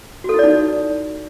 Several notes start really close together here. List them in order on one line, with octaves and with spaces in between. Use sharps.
F#4 A4 E4 D5 D#4